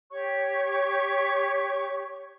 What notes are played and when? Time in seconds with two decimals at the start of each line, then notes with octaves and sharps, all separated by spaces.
0.11 G4 C#5 C#6